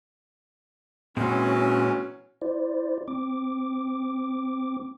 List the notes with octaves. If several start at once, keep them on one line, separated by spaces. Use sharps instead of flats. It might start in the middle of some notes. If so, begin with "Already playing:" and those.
A#2 E3 F#3 G#3 C4 C#4
E4 C5 D5
C4 D6